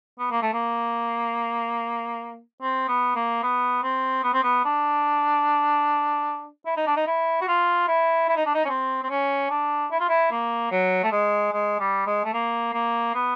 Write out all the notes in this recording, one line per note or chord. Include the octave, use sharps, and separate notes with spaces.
B3
A#3
A3
A#3
C4
B3
A#3
B3
C4
B3
C4
B3
D4
E4
D#4
D4
D#4
E4
F#4
F4
E4
E4
D#4
D4
D#4
C#4
C4
C4
C#4
D4
E4
F4
E4
A#3
F#3
A3
G#3
G#3
G3
G#3
A3
A#3
A#3
B3